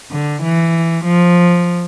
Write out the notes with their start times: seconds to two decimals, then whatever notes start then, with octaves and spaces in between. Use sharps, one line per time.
0.11 D3
0.42 E3
1.04 F3